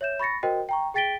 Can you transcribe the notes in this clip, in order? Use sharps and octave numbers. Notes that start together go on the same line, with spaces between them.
C#5 E5 G6 E7
B5 C#6 A6 A#6 C#7
F#4 A#4 C5 D#5 G5
G5 A#5 C#6
G#4 G5 A6 B6 D7 G7